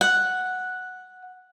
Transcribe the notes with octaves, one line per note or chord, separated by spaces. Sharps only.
F#5